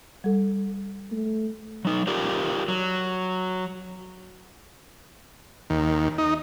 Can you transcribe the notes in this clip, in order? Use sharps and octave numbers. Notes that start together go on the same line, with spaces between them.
G3 A4
A3
F#3 D#4
F4 G4 A#4 D5 F5 G5
F#3
D#2
D#4